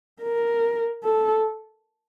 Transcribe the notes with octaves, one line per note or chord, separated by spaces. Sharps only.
A#4
A4